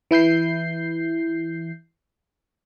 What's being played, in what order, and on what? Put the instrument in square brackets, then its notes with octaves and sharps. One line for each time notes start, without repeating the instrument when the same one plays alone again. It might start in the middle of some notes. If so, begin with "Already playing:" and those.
[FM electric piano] E3 E4 G6 C7